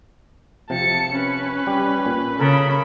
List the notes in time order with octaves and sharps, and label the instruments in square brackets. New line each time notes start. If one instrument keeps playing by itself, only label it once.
[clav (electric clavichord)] C3 F3 [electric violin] A5 C#7
[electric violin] C#4 B4
[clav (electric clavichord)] G3 G4
A#2
[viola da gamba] C#3 [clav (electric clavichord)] A4 A#4 A5 [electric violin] B5